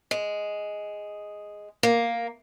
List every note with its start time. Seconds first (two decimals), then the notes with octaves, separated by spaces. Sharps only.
0.11 G#3
1.83 A#3